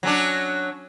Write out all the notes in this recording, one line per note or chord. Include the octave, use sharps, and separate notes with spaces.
F#3 C#4 D4